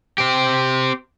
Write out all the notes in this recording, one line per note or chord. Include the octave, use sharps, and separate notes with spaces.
C4 G4